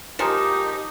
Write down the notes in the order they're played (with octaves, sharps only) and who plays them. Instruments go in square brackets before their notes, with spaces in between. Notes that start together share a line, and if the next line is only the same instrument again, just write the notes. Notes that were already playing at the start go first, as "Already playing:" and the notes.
[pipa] D#3 F3 G#3 [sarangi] D#4 [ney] G4